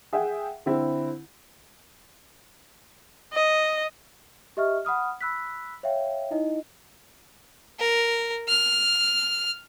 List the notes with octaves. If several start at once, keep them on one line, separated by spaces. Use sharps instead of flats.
G#4 E5 F#5 G5
D3 C4 E4
D#5
G4 D#5 E5 C#6 F6
F#5 B5 D#6 F6
B5 E6 F#6 B6
C#5 E5 F5 G5
D#4 E4 D#5
A#4
F6